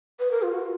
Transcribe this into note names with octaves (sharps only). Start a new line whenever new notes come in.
B4
A#4
F4
F#4
F4